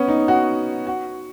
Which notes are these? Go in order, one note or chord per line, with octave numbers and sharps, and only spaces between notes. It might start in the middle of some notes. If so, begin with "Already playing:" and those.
Already playing: B3 C#4
D#4
F#4
F#4